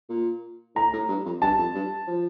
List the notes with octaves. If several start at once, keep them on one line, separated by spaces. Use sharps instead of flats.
A#2
A2 A#5
A2
G2
F2
G2 A5
F2
G2
F3